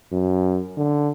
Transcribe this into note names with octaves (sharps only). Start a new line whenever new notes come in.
F#2
D3